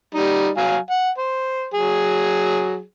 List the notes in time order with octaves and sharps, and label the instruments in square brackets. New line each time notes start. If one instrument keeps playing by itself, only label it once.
[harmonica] G3 D#4
F#3 F5 G#5
F#5
C5
F#3 G#4